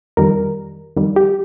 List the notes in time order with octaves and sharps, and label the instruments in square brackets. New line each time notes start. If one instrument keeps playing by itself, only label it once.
[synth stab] F2 D#3 G3 A#4
F2 D#3 G3
G4